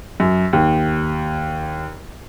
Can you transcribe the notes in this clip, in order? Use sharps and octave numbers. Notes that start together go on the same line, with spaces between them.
F#2
D#2